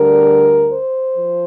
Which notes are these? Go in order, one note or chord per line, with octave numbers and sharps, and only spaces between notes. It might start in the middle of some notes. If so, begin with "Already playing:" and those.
Already playing: D2 D3 G3 A#4
C5
F3